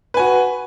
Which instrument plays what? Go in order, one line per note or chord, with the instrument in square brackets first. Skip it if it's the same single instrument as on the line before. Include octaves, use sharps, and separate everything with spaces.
[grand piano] B4
G#5
F#4